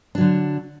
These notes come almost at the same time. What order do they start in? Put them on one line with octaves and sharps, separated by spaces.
D4 F#3 D3